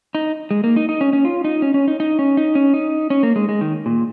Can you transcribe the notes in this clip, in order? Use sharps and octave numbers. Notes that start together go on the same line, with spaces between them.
D#4
G#3
A#3
D#4
D#4
C#4
C#4
F4
D#4
C#4
C#4
D#4
D#4
C#4
D#4
C#4
D#4
C#4
A#3
G#3
G#3
D#3
A#2